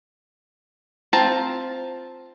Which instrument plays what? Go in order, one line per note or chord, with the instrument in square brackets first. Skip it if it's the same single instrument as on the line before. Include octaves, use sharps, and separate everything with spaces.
[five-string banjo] C4 F4 A5 A#5